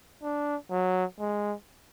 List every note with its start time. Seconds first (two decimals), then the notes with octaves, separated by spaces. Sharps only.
0.22 D4
0.70 F#3
1.19 G#3